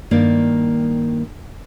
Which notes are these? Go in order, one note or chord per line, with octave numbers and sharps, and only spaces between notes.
G2 D#3 A#3 D5